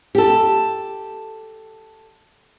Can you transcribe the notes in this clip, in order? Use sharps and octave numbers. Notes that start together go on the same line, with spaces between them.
G4 A4